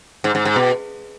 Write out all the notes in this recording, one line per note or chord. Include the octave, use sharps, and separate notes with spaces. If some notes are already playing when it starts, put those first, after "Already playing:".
G#2
G#2
G#2
B2